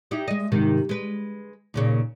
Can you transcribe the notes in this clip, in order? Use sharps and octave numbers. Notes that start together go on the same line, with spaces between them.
D#4 E4 G4
G#3 D#5
G#2 C3 D#3
G#3 B4
D#2 A#2 C#3